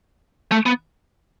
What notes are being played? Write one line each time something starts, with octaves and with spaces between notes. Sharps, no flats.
A3
B3